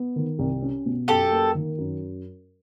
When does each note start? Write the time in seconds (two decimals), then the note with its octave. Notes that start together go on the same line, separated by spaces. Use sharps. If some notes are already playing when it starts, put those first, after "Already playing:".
Already playing: B3
0.16 D#3
0.39 C2
0.62 C#4
0.86 B2
1.08 F#2 G4 A4
1.31 A#3
1.55 D#3
1.78 F#2